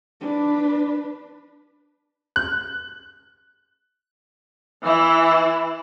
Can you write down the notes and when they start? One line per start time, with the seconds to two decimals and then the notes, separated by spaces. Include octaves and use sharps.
0.21 D4 B4
2.36 F#6
4.83 E3 E4